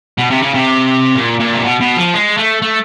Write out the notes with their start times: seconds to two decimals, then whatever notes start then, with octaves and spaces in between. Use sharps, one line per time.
0.18 B2
0.31 C3
0.43 C#3
0.55 C3
1.15 A#2
1.40 A#2
1.54 C3
1.64 B2
1.81 B2
1.97 F3
2.14 G#3
2.37 A3
2.62 A3